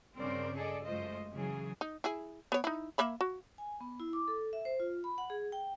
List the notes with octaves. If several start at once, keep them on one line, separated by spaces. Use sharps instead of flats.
G2 C#3 C4 A#4 C5 D5
G#4 A4 D5 D#5
F#2 G#3 A3 F4 C5 D#5
C#3 E3 F#3 G#4
D#4
E4 G#4
B3 C#5
D#4 E4
A#3 E5 B5
F#4
G#5
B3
E4
D6
A4
E5
C5
F4
B5
F#5
G#4
G5